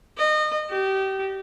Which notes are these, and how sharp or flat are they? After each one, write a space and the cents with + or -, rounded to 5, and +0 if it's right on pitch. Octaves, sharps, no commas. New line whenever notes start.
D#5 -30
G4 -25